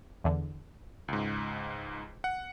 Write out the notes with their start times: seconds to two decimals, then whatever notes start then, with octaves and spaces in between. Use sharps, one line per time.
0.24 E2 D3
1.08 C#2 G#2
2.24 F#5